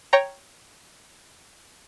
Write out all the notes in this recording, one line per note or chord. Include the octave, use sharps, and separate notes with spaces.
C#5 G5 A#5